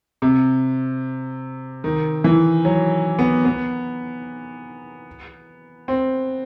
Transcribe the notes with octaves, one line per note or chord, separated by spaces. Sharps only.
C3
D#3
E3
F#3
B3
B3
C4